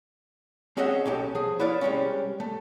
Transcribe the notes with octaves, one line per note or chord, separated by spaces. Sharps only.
C4 C#4 G#4 D#5 E5 F#5
B1 C#4 G4 A4
F3 G#4
E4 B4 C#5 D5 F5
C3 G3 G#3 C#4
A3